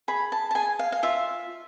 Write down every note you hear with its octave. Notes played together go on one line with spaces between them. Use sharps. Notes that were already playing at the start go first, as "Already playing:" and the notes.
G#4 B5
A5
A5
G#4 G#5
F5
F5
F4 E5